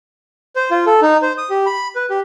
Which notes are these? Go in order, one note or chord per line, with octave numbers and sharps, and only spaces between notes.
C5
F4
A4
D#4
C5
D#6
G4
B5
B4
G4